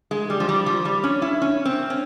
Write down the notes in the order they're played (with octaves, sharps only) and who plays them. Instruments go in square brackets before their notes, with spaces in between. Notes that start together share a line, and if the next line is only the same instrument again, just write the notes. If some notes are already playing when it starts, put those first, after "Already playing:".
[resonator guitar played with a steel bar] G#3
G3
F3
G3
F3
G3
C#4
E4
C#4
C4
C#4